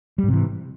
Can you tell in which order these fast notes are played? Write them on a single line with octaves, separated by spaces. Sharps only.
G3 G#2 C3 E3